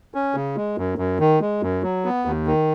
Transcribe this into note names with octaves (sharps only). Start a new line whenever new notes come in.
C#4
C#3
G#3
F#2
F#2
D#3
G#3
F#2
F#3
B3
D#2
D#3